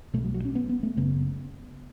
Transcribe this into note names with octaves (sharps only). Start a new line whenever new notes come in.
B1 B2 A3
F#3
F#3
C#4
B3
B3
A3
F#1 F#2 C#3 B3